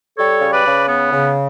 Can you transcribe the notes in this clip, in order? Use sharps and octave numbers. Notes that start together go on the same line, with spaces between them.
G3 A4 C#5
C#3
B4 D5
C#3
B3
C#3